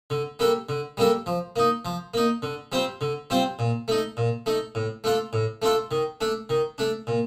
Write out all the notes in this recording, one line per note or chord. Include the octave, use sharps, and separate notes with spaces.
D3
G3 A#3 D4 A4
D3
G3 A#3 D4 A4
F3
A#3 D#4
F3
A#3 D#4
D3
G3 C4 F4 C5
D3
G3 C4 F4 C5
A#2
A3 D#4
A#2
A3 D#4
A2
A3 D4 F4 A4
A2
A3 D4 F4 A4
D#3
A3 D4
D#3
A3 D4
A#2